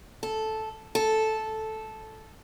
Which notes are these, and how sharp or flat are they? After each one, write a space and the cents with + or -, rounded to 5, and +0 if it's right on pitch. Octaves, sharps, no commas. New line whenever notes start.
A4 -5
A4 -10